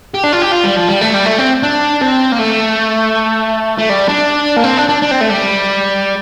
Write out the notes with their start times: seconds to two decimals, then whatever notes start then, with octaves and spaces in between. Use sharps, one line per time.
0.14 G4
0.24 D4
0.32 F4
0.42 G4
0.52 F4
0.64 G3
0.76 F3
0.88 G3
1.01 A3
1.14 G3
1.26 A3
1.39 C4
1.63 D4
2.01 C4
2.32 A#3
2.38 A3
3.78 A3
3.89 G3
4.08 D4
4.56 A#3
4.64 C4
4.77 D4
4.89 D4
5.02 D4
5.11 C4
5.21 A3
5.30 G3